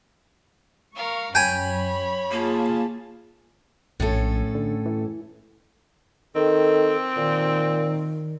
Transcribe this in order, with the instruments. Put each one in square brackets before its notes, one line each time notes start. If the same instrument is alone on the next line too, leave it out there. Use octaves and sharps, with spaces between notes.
[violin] A#4 F5 [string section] C#6
[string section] F#2 [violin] C#5 B5 [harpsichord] G5 G#5
[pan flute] A#3 [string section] F4 G#4 A5
[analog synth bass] A#1 [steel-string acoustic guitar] A2 C#4 A4
[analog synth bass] D3
E3
[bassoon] D#3 [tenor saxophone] C4 [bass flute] A4
[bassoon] A#2 [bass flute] D#3